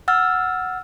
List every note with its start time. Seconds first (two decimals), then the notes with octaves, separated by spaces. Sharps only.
0.08 F#5 E6 F6 A6